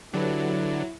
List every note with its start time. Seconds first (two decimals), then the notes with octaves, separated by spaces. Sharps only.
0.13 D3 F#3 E4 G4 A4 B4